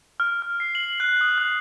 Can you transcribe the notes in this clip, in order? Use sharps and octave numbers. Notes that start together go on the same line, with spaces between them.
F6
F6
C7
F#7
F#6
D#6
F#6